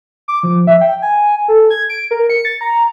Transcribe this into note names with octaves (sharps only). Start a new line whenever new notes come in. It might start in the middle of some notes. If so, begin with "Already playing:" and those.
D6
F3
E5
G5
G#5
A4
G#6
D7
A#4
C#7
A6
A#5